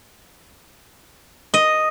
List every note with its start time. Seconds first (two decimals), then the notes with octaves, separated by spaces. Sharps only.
1.54 D#5